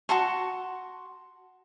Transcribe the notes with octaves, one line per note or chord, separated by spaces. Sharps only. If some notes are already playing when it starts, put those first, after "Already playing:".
F#4 A5 C6 C#6